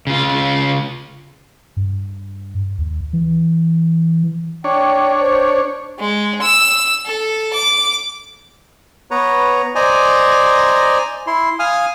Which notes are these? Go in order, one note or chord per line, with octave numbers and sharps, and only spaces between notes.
C#3 F4
G2
D#2
E3
D4 C#5 G5
C5
G#3
E6
A4
D6
B3 B4 C#5 A#5
C5 D5 D#5 G#5 A#5
E4 C6
F5 G#5 D#6 F6